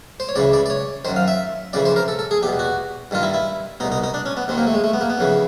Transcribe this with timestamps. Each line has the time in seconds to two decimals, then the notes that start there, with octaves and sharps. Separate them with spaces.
0.20 C5
0.29 C#5
0.36 C#2 C#3 E3 D5
0.53 D5
0.66 D5
0.70 C#5
1.05 F#2 D#3 C5
1.16 F5
1.28 E5
1.73 F2 C#3 E3 D5
1.85 C5
1.96 A#4
2.08 A4
2.19 A4
2.31 G#4
2.43 E2 G4
2.47 B2
2.59 F#4
3.11 G2 D#3 F4
3.23 E4
3.34 E4
3.80 B2 D#4
3.84 C2
3.92 D#4
4.04 D#4
4.14 D4
4.26 C#4
4.37 B3
4.48 D#2 D#3 C4
4.58 A#3
4.67 A3
4.74 G#3
4.84 A3
4.94 B3
5.01 A#3
5.10 B3
5.18 F2 C#3 E3